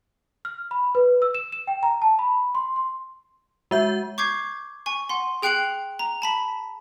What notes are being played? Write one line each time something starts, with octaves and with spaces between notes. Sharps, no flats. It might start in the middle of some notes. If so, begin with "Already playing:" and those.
F6
B5
B4
E6
E7
E7
G5
A#5
A5
B5
C6
C6
G#3 F#4 E5 G6
C#6 D6 G6 G#6 C7
G#5 C#6
F#5 C6
G#4 G5 F#6 C7 C#7 F#7
A#5
A5 B5 B6